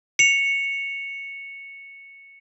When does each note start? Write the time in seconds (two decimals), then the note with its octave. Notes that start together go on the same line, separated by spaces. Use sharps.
0.19 C#7 F7